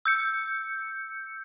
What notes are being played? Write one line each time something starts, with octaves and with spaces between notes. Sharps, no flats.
E6 G6 C#7